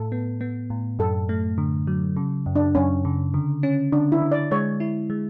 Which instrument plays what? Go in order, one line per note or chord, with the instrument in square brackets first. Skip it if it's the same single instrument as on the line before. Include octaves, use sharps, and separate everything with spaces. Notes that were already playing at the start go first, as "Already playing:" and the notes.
Already playing: [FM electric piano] A2 [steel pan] A4
[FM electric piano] B3
B3
A2
[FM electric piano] F#2 [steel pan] A4
[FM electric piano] A3
D3
F#3
C#3
F#2
[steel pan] D4
[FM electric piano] F#2 [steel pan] C#4
[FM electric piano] C#3
D3
C#4
[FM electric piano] D3 [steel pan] D4
[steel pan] E4
[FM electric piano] D3
[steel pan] D5
[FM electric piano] G#3 [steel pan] C#5
[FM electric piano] E4
G#3